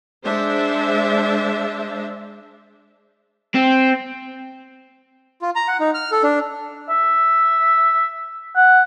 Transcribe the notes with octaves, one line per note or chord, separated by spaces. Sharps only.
G#3 D4 C5 E5
C4
F4
A#5
F#5
D#4
F6
A4
D4
E5
F#5